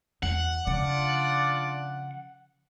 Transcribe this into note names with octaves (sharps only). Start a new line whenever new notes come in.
E2 F#5
C#3 F3 D4 F4 D5